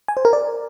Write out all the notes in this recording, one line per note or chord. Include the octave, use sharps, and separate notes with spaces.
G#5
C5
A#4
D5